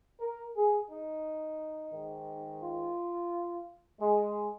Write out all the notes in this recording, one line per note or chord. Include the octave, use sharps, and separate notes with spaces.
A#4
G#4
D#4
G#2 D#3
F4
G#3